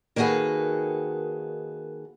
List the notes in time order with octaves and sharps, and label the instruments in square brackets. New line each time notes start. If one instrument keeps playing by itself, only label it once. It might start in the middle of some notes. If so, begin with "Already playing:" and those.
[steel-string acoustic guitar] D#3 A#3 F#4 G#4 A4 B4